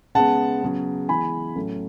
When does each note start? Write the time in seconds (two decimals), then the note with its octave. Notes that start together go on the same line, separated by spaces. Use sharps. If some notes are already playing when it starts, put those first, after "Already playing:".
0.15 C#3 G#3 B3 F#5 A5
0.63 C#3 F#3 B3
1.09 E3 G#3 B3 G#5 B5
1.56 A2 F#3 A3 C#4